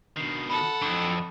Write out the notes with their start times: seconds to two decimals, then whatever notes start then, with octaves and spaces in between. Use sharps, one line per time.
0.16 B2 D#3 D4 C7
0.50 A4 F#5 B5
0.82 F2 D4 E4